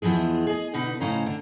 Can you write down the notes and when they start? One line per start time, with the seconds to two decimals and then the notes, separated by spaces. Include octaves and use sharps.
0.02 E2 E3 F3 G#3 G#4
0.47 G#4 D#5
0.74 B2 D3 D#4 B4
1.00 A2 C#3 C#4 C5 D#5 A#5
1.26 D3